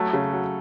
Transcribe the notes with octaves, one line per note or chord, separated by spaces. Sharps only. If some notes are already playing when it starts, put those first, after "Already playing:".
Already playing: F#3 A3
C#3
F#3